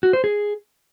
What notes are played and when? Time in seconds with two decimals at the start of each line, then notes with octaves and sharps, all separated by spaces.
0.03 F#4
0.13 C5
0.24 G#4